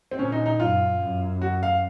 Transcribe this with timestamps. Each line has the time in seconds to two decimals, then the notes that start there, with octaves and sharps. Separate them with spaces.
0.11 C4
0.19 A#2 C#4
0.32 D#4
0.46 D#4
0.60 F#2 F4
1.00 F#2
1.42 F#4
1.63 F5